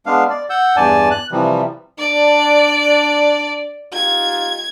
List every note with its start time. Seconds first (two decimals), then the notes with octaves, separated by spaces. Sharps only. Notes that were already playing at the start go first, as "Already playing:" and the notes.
0.06 G#3 B3 D4 F5
0.30 D5
0.50 F#5 E6 G6
0.76 E2 G2 D5 G#5 A5
1.11 F#6
1.32 C3 E3 F3 G3
1.98 D4 D5
3.93 D#4 F4 G4 G#6